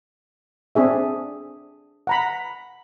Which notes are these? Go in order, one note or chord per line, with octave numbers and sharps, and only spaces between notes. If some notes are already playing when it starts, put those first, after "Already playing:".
C4 D4 G#4 E5
F#5 A#5 B5